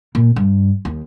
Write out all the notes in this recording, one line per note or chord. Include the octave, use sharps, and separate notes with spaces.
A#2
G2
D#2